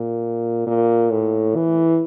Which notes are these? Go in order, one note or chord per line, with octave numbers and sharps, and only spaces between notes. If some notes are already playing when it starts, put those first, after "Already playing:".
Already playing: A#2
A#2
A2
E3